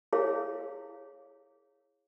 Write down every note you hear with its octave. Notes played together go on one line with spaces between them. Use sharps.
E4 G#4 C#5 F5